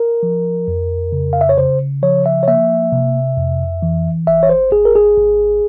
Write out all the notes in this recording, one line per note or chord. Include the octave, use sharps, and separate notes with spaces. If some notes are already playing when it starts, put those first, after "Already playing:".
Already playing: A#4
F3
F2
C#3
F5
E5
C#5
C#3 C5
F3 C#5
E5
C#5
A#3 E5
C3
F2
E3
G#1 E5
C#5
C5
G#1 G#4
A#4
G#4
G#1